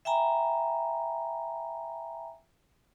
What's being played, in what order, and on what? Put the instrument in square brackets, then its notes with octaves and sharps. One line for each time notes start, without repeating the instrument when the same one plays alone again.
[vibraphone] E5 G5 G#5 A#5 B5